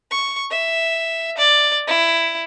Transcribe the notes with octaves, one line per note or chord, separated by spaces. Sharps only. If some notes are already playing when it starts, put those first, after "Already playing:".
C#6
E5
D5
E4